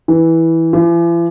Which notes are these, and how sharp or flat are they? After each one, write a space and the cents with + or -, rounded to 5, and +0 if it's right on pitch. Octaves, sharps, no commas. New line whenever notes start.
E3 -10
E3 +45